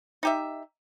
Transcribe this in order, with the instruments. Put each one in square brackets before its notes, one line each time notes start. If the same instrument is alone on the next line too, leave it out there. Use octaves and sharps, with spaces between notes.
[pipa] D#4 G4 E5